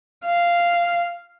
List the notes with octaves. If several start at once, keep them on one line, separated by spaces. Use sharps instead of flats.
F5